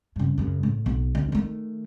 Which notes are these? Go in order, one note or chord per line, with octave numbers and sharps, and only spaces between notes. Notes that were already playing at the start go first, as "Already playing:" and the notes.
G2 C#3
F#2 C#3
A2
B1
D2
D#3 A3